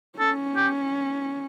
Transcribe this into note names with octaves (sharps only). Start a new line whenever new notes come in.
C#4 A4
G4